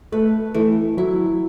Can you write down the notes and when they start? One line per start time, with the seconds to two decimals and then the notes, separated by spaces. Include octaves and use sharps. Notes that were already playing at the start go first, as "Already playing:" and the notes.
0.12 A3 B4
0.54 E3 A3
0.97 F#3 E4